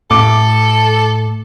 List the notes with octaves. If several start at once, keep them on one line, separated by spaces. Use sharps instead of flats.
A2 A4 D6